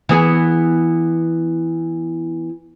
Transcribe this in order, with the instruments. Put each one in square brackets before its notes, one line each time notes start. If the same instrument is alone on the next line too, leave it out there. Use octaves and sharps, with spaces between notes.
[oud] E3 B3 G#4